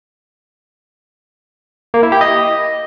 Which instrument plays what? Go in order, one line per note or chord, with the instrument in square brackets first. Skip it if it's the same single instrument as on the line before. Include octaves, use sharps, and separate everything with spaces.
[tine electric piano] A#3
E4
G4
D#5